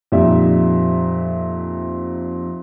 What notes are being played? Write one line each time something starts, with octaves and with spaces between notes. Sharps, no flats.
F2 A#2 G3 D#4 D5 E5